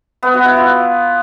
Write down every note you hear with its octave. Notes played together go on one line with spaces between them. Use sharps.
B3
F#4
E4
F4